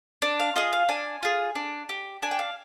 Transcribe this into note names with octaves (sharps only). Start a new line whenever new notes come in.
D4
F5
F4 G#4 D#5
F5
D4 G#5
F4 G#4
D4
G4
D4 G#5
G5
F5